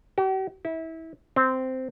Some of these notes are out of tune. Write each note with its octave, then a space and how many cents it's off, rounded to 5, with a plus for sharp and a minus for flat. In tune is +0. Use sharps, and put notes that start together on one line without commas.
G4 -45
E4 -25
C4 -10